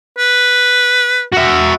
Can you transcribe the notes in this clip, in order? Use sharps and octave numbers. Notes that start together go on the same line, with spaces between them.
B4
F#4 E5